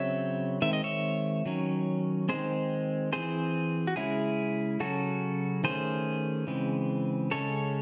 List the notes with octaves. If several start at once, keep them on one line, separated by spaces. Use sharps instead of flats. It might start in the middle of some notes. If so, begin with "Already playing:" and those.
Already playing: C#3 F#3 C4 C#5 E5
D#3 G#3 C4 E5
D#5
C#5 E5
D#3 F#3 C#4
D#3 G#3 C4 G#4 C5
E3 C4 G#4 C5
F#4
C#3 G#3 C#4 E4 G#4
C#3 F#3 C#4 F#4 A4
D#3 A3 C#4 G#4 C5
C#3 E3 G#3 C4
C#3 G#3 C#4 A4 C#5